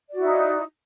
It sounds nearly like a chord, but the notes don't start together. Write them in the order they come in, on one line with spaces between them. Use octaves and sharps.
D5 F#4 E4 D#4